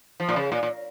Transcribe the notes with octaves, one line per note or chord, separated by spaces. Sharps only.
F3
A#2
C#3
A#2
A#2